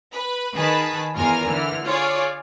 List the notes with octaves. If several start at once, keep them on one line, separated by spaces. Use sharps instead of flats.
B4
D#3 G#4 B4 A5 B5 B6
E2 F4 A#4 G#5 F6
D3 E3 F6
F4 G#4 C#5 D5